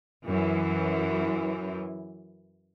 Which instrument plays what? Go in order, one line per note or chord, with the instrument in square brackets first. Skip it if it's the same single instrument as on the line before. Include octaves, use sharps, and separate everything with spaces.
[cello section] F#2 E3